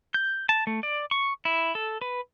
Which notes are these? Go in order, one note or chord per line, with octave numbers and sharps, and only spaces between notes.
G6
A5
A3
D5
C#6
E4
A4
B4